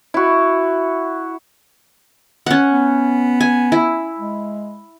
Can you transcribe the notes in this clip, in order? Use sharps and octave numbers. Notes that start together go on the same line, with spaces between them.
E4 F#4
C#4 F#5
B3
G#5
E4
G#3